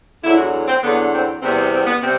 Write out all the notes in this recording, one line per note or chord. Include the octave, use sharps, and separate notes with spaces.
E2 D3 F#3 E4
F#4
C4
E2 D3 F#3 B3
C4
E2 C3 G3 B3 C4
C4
C4
B3
C3 G3 C4